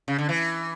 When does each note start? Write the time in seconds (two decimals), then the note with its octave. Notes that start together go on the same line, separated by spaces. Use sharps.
0.08 C#3
0.18 D3
0.29 E3